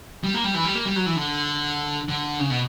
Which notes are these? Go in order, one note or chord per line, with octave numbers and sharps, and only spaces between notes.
G3
A#3
G3
E3
G3
A#3
G3
F#3
E3
D3
D3
C#3
B2